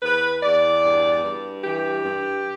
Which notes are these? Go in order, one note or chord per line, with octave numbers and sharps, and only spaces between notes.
E2 B4
E2 D5
G2
G2
E3 G4
G2